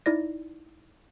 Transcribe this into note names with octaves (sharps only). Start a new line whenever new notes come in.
D#4 E4 D5 A#6